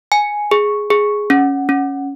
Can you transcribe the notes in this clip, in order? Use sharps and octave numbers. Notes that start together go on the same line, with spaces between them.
G#5
G#4
G#4
C#4
C#4